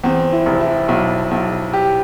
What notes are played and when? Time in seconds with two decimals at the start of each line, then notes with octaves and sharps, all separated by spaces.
0.04 E2 C4
0.32 E4
0.46 F1
0.60 E4
0.88 B1
1.31 B1
1.73 G4